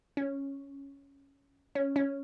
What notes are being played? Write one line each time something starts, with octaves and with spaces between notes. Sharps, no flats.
C#4
C#4
C#4